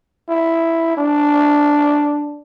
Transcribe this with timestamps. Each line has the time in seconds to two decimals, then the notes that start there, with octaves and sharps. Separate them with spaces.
0.28 E4
0.97 D4